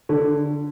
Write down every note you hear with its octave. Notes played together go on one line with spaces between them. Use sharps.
D3